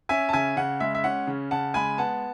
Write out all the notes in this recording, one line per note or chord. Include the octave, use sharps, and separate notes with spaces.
C#4 E5 G#5
A5
C#3 E5 G#5
C#3 F#5
G#3 E5
E5
C#4 F#5
C#3
C#3 F#5 A5
G#3 G#5 B5
B3 F#5 A5